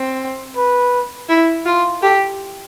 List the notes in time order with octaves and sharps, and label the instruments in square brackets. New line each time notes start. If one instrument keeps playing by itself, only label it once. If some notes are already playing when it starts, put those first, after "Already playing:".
Already playing: [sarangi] C4
[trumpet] B4
[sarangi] E4
F4
[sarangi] G4 [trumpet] A4